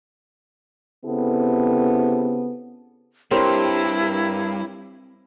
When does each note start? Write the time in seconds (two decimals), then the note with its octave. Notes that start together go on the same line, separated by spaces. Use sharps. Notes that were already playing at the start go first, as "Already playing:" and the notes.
1.05 C#3 B3 C4 E4 G4 A4
3.31 G2 C4 E4 G4 A#4 C#5